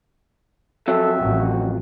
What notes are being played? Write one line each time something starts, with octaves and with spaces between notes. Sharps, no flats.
F2 F#3 A4 E5
A1 F#4